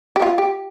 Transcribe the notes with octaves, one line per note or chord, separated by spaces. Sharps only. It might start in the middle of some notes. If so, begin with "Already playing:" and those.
G4
F4
G4